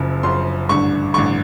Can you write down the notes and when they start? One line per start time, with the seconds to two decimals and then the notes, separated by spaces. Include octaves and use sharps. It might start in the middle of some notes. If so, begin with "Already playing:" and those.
Already playing: F#1 F#2 C#3 F3
0.23 F#1 F#2 C#3 F3 C6
0.69 A1 G2 D3 C#6
1.14 A1 G2 D3 C#6